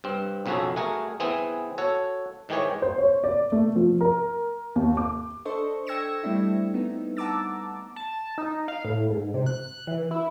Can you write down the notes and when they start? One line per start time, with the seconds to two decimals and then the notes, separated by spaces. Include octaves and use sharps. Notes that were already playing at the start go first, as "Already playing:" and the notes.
0.04 G2 C4
0.46 B1 F2 C#3 F#4 G#4 A4
0.76 A3 F#4 G#4 A#4
1.20 E3 B3 C4 G#4
1.78 F#4 A4 C#5
2.49 G#2 D#3 E3 G4 G#4 C#5
2.82 C5
2.98 C#5
3.24 D5
3.52 A3
3.76 F3
4.01 A#4
4.76 D#2
4.97 D6
5.45 D4 A4 C5 D#5 C#6
5.87 G5 E6 G#6 A#6 C#7 E7
6.23 G3 A3 C4 D4 E4
6.74 B3 D#4
7.17 F#5 A5 A#5 D6 E6 A6
7.96 A5
8.38 D#4
8.68 F5
8.85 A2
9.10 G#2
9.34 C3
9.46 F#6
9.87 E3
10.11 E4